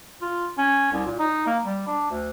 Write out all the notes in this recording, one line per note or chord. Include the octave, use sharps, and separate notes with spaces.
F4
C#4
C2
A#2
D#4
A#3
G3
D4
D2